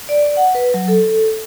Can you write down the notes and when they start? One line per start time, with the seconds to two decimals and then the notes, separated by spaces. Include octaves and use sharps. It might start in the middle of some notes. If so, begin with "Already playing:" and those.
0.09 D5
0.37 F#5
0.55 B4
0.74 F#3
0.88 A4